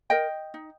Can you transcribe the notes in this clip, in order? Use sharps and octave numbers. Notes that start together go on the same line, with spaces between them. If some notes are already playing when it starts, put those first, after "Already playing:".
A#4 D#5 G5
D#4